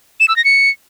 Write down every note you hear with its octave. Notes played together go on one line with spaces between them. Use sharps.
E7
E6
A#6
C#7